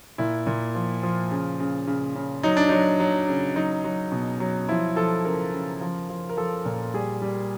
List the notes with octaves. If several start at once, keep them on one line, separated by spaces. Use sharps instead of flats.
A#2 E4
A#2
F3
F3
C#3
C#3
C#3
C#3
F#3 D#4
D4
F#3 D#4
F#3
C#3
F#3 D#4
F#3
B2
F#3
F3 E4
F3 A4
C#3 A#4
C#3
F3
F3
A#4
F3 A4
A#2
G3 G#4
G3